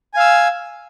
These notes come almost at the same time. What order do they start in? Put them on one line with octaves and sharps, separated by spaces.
G#5 F5 E6